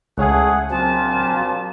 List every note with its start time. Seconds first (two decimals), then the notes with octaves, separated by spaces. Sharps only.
0.18 C#2 A2 A3 G#4 C#5 F5 F#5
0.71 A#1 A#2 F#3 C4 F4 A5